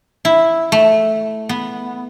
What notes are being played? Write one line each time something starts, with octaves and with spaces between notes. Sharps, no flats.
E4
A3
B3